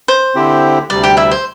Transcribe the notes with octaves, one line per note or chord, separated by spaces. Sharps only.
C5
D3 C4 E4 G4
D2 C3 G3 D5
G4 G5
E4 E5
C5